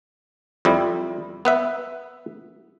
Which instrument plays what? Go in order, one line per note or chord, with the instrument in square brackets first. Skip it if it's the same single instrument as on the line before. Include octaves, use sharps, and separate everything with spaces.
[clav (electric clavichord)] F2 G3 E4
B3 B4 E5